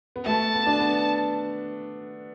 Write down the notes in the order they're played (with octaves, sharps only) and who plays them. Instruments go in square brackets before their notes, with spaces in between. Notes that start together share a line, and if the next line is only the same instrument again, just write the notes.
[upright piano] B3
[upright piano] A3 [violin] A5
[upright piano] B3
D4
B3